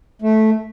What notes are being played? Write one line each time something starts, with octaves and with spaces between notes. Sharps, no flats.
A3